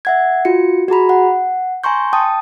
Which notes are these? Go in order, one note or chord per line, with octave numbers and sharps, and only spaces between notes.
E5 F#5 G#6
F4 F#4 C#7
F#4 G#4 A#5 B5
F#5
G#5 A#5 C6 C#6 G6
G5 A5 D#6